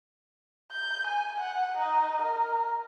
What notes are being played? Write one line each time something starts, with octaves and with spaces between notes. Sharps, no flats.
G6
G#5
F#5
D#4
A#4